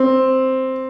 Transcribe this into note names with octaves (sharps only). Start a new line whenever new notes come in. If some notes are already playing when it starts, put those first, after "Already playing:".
Already playing: C4